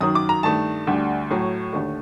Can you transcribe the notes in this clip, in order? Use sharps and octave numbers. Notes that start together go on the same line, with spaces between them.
F#2 D#3 F#3 D#6
D6
A#5
G2 D#3 A3 A5
D2 D3 G3
A2 F#3 A3
D#2 D3 A3